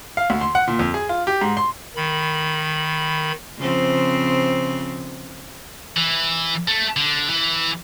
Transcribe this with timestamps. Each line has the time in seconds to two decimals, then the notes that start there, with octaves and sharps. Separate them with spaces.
0.17 F5
0.30 D2
0.41 C6
0.55 F#5
0.68 A#2
0.79 F2
0.94 G#4
1.09 F4
1.27 G4
1.41 G#2
1.57 C6
1.96 D#3 B5
3.59 C#3 F3 C4
5.96 E3
6.68 A3
6.97 D3
7.30 E3